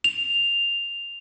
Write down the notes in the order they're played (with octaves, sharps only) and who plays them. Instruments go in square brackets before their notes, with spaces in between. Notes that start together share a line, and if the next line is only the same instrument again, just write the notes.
[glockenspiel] F7